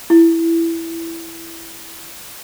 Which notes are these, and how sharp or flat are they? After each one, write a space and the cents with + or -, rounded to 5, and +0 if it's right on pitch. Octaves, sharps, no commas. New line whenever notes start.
E4 +10